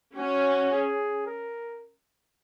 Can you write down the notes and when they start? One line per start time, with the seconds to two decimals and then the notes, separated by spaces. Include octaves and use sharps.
0.16 C#4 F#4
0.72 G#4
1.27 A#4